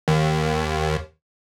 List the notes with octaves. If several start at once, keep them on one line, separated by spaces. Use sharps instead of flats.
D#2